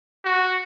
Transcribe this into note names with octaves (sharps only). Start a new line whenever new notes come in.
F#4